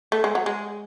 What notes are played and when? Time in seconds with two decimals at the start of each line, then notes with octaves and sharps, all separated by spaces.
0.12 A3
0.24 G#3
0.35 F#3
0.46 G#3